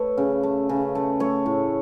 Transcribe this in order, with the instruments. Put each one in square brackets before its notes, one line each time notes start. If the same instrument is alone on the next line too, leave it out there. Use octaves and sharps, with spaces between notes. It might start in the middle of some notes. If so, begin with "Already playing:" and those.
Already playing: [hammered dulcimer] A3 B4 C#5
C#3
A3
C#3
A3
A3 C#5
A2